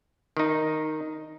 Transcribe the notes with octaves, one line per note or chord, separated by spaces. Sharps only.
D#3 D#4